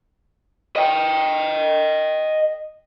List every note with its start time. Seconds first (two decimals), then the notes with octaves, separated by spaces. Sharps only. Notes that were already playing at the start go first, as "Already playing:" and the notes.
0.76 D#5 G5